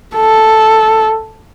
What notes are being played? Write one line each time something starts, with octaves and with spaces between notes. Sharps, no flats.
A4